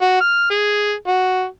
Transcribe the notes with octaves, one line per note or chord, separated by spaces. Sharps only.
F#4
F6
G#4
F#4